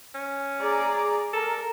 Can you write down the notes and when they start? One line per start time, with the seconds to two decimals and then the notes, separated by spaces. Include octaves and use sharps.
0.14 C#4
0.60 G#4 D5 A#5
1.33 A4 A#4